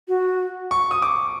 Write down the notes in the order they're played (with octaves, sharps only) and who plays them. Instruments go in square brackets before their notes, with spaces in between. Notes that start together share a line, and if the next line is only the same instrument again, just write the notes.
[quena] F#4
[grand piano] C#6
D#6
D6